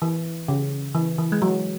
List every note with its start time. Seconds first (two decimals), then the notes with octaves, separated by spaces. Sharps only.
0.02 E3
0.48 C#3
0.95 E3
1.18 E3
1.32 G#3
1.42 F#3